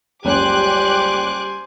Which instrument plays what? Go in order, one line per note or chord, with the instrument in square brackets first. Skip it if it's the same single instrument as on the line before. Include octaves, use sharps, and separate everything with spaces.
[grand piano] F#1 C#2 [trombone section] G3 G4 [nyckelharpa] C5 G#5 [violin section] D6 F#6